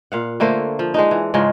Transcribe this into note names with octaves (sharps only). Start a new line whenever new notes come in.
A#2 F5 F#5
D3 A3 A#3 C5
F3
G#3 D4 D#4
E3
G#2 C#3 F3 G#3